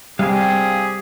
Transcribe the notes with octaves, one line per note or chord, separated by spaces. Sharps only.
G3 C4 G4 G#4 F5